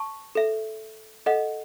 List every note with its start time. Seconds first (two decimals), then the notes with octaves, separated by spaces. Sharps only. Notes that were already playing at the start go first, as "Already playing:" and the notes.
Already playing: A5 C#6
0.35 A4 E5
1.26 A4 D#5 F#5